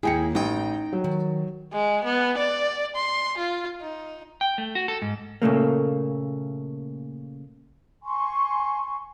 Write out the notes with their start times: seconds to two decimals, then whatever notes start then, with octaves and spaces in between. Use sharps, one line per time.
0.03 D#2 A#3 E4 G#4 G5 C#7
0.35 A1 D#4 G5
0.93 F#3
1.04 D#3
1.73 G#3
2.04 B3
2.38 D5
2.96 C6
3.38 F4
3.82 D#4
4.41 G5
4.58 A3
4.75 F#4
4.88 A4
5.02 G#2
5.42 A#2 C#3 A3 A#3
8.03 G#5 C6 C#6